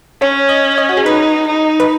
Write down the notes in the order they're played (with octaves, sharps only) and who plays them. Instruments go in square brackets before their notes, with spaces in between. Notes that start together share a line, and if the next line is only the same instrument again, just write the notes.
[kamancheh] C#4 [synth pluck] C#5
[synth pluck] D#5
D#5
F#4
G#4
[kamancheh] D#4 [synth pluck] B4
[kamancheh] D#4
[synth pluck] B4